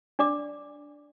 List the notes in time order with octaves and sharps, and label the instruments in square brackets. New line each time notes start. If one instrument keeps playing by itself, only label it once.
[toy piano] D4 D5 D6